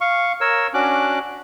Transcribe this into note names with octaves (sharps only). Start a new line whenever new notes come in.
F5 C#6
A#4 C#5 E6
C#4 D4 F#4 D6 F#6